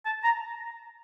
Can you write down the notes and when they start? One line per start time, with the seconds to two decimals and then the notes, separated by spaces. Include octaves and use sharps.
0.06 A5
0.24 A#5